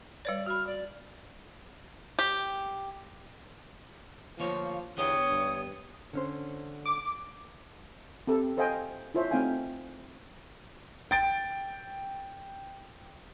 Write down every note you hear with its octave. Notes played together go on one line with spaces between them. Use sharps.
G3 B4 C#5 D5
F#4 B5 F6
D5
G4
D2 F3 A#3 C#5 F5
E2 D3 B3 G4 C#5 D#6
G2
D3 C#4 C5
D6
C4 G4 A4
A4 C5 D#5 F5 G5 G#5
E4 F4 C5 C#5 E5
A3 C4 D#4 F5 G5 G#5
G5 A6 D7